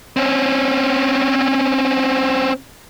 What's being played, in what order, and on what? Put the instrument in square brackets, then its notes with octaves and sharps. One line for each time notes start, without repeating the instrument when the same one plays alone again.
[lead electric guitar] C4 C#4